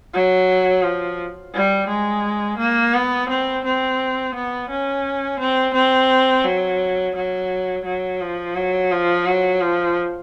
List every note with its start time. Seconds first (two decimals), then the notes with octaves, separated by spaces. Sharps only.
0.14 F#3
0.83 F3
1.54 G3
1.88 G#3
2.58 A#3
2.94 B3
3.29 C4
3.65 C4
4.35 B3
4.70 C#4
5.40 C4
5.74 C4
6.45 F#3
7.15 F#3
7.85 F#3
8.21 F3
8.55 F#3
8.91 F3
9.26 F#3
9.61 F3